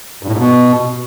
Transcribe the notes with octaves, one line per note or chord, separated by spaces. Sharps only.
G2
A2
G#2
B2